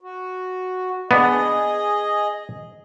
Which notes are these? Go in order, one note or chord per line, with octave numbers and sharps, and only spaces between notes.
F#4
B3 D4 G#4 D#5